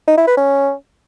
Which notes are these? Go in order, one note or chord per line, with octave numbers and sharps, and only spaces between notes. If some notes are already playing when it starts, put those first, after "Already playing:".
D#4
E4
B4
C#4